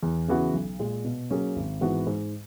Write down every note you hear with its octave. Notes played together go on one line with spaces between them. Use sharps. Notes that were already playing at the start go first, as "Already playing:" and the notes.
E2
C#3 E3 B3 F#4
B1
A#2 G#3
B2
F#3 A#3 C#4 G#4
G#1
G#2 E3 B3 F#4
G#2